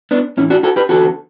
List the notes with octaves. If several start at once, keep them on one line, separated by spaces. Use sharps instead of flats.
B3 D4
A2 E3 C#4 E4
D4 F#4
F#4 A4
G4 B4
E2 D3 F#4 A4